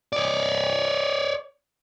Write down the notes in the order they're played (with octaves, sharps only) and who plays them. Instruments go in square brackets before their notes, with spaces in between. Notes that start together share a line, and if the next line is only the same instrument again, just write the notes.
[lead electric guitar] C#5 D5